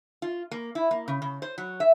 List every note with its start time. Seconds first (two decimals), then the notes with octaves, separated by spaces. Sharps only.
0.22 F4
0.51 A#3
0.75 E4
0.91 A#3
1.08 C#3
1.22 C#3
1.42 C5
1.58 F#3
1.80 E5